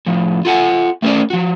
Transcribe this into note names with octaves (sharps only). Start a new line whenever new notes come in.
A2 F3
F4 A4 F#5 G#5
A3 C#4 A#4 C5 D5
F3 F#4